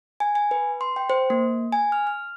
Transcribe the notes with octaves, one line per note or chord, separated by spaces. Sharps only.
G#5
G#5
B4
C6
G5
C5
A#3
G#5
F6
F6